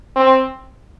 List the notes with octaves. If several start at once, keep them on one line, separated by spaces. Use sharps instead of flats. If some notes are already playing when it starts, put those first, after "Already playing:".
C4